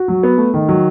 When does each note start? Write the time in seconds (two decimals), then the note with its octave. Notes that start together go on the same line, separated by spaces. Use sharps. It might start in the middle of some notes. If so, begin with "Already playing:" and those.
Already playing: F#4
0.08 F#3
0.23 B3
0.38 A3
0.54 D#3
0.69 F#3